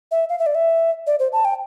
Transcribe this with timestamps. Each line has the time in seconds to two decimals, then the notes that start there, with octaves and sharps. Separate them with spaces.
0.11 E5
0.29 F5
0.39 E5
0.46 D5
0.55 E5
1.07 D5
1.19 C5
1.33 A5
1.45 G5